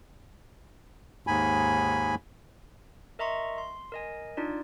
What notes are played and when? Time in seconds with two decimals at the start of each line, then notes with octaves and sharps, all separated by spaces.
1.27 D#2 G#2 G#5 B5
3.19 A#4 D#5 E5 A#5 C6 C#6
3.58 C6
3.92 A#4 D#5 G#5
4.37 D4 D#4 F4 D5